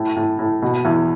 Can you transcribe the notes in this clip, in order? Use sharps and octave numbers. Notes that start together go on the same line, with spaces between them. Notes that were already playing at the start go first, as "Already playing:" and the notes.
Already playing: A2
A2
A2
B2
E2